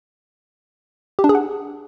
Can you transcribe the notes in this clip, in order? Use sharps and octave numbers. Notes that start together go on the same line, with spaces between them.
G4
D4
G#4
F#5